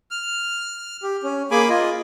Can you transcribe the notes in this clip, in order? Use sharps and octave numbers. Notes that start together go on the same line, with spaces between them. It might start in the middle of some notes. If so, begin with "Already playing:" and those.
F6
G4
C#4
A#3 G#4 G#5 B5 D6
F4 D#5